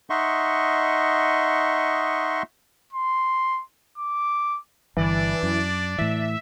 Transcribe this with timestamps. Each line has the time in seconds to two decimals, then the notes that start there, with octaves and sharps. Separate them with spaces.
0.10 D#4 D#5 E5 F#5 C6 C#6
2.93 C6
3.98 D6
4.97 G1 E3 D4 D5
5.43 F#2
5.98 A2 E3 E5